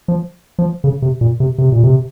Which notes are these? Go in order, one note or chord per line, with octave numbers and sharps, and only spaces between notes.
F3
F3
C#3
C3
A#2
C3
C3
A#2
C3